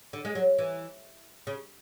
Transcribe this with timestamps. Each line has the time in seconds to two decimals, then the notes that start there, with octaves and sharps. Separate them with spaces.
0.13 D3
0.25 G#3
0.35 F#3
0.58 E3
1.47 C#3